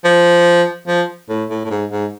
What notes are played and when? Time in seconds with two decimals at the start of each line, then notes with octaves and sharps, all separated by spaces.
0.04 F3
0.88 F3
1.29 A2
1.50 A2
1.65 A2
1.71 G#2
1.91 G#2